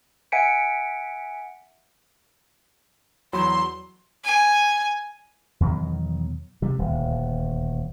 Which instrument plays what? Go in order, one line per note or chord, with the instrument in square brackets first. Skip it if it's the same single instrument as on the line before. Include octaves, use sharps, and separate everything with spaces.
[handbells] E5 F#5 G#5 B6 C#7 D7
[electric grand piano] E2 F#3 B5 [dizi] C6
[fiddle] G#5
[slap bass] E2 B2 D#3 F#3
C3 G3
D#1 D2